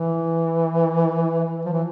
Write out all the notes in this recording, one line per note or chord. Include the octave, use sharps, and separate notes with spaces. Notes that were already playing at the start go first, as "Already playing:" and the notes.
Already playing: E3
F3
E3